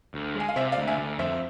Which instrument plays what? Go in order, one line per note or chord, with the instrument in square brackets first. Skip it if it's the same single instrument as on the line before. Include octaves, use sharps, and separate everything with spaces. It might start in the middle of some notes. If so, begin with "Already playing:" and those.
[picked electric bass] D2
[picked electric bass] G#3 [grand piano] G#5
[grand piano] F5
[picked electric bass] C3 [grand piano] C5 E5
[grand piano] D5 F5
[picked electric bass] D2
[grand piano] E5 G#5
[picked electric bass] D2
[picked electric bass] F2 [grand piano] C5 E5